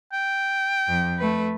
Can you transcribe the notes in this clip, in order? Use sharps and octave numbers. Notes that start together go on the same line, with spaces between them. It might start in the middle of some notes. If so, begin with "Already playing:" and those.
G5
F2
A3 B4